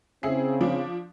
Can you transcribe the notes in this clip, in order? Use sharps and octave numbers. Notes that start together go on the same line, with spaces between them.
C#3 C4 E4 G#4 C7
F3 D4